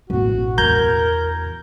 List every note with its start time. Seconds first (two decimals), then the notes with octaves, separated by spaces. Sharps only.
0.10 A1 B2 F#4
0.58 E2 A#4 A#5 G6 G#6